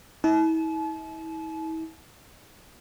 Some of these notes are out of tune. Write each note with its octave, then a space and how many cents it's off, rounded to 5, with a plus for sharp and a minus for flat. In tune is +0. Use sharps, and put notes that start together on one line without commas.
E4 -40 A5 -40